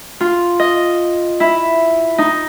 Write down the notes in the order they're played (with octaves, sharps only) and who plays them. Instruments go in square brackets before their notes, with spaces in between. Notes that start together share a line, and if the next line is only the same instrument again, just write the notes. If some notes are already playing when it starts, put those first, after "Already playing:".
[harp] F4
D#5
E4
D#4